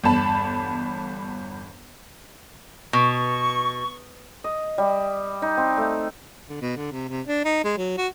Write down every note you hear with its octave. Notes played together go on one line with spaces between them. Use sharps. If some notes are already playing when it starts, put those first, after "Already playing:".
G1 E2 A5 B5
B2 C#6
D#5
G3
D#4
C4
A3
D3
B2
D3
C3
C3
D4
D#4
G#3
F#3
F#4